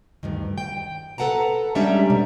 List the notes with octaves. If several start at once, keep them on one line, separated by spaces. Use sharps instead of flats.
D2 G2 D#3
G5
A4 B4 F#5 A5 A#5
G3 G#3 C#4 D4 E5 A#5
B2